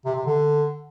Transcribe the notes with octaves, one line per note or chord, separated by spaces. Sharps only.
C3
C3
D3